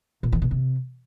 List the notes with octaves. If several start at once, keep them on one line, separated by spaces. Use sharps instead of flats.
A#2
D#3
B2
C3